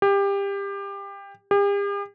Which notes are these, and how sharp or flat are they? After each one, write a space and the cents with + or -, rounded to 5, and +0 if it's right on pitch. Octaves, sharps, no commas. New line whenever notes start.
G4 +25
G4 +45